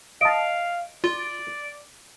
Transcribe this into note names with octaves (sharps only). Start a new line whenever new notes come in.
D#5 F5 A5 D7
F4 D5